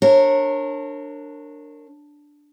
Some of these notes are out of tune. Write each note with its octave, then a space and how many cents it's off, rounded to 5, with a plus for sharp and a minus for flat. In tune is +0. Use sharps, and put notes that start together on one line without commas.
D4 +0 A#4 -25 C#5 -30